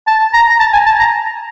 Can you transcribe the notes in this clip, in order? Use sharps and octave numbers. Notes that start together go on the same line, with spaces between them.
A5
A#5
A#5
A5
G#5
A5
A#5